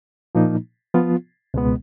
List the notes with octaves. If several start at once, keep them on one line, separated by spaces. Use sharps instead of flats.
A#2 F3 A#3 D#4
F3 B3 F4
C#2 B2 G#3 B3